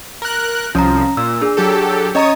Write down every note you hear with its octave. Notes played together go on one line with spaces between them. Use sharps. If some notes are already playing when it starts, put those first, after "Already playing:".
A#4 F#6
C2 F3 C#4 A#5
A#2 E6
D4 G#4
F#3 G4 A4
C#4 C#5 D#5 A#5 D#6